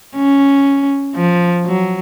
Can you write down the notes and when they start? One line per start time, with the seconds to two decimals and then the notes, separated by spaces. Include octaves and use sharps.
0.15 C#4
1.15 F3
1.66 F#3